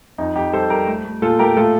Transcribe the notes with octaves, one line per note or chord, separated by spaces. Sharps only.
F2 D#4
F2 D#4 G4
G3 A4 C5
G3 G4 A#4
A3
A3
A#2 F4 A4
A3 G4 A#4
A2 F4 A4